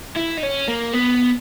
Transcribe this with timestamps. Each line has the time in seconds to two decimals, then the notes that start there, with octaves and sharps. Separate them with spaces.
0.16 E4
0.37 D#4
0.43 C#4
0.68 A#3
0.93 B3